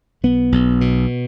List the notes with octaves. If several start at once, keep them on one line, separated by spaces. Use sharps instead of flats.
B1 B3
B1
B2